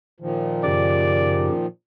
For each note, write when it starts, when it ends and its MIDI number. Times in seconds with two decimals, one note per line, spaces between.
0.20 1.66 46
0.20 1.66 51
0.20 1.66 53
0.64 1.49 42
0.64 1.49 49
0.64 1.49 67
0.64 1.62 74